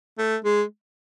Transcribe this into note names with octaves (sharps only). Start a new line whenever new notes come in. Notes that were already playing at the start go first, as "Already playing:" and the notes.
A3
G#3